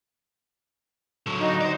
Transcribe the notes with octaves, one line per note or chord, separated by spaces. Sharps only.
D3 F#3
D#4 F#4 D#5
C5 D5